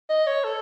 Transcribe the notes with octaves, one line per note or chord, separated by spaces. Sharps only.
D#5
C#5
A4